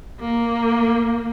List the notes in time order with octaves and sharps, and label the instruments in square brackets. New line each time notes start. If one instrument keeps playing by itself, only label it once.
[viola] A#3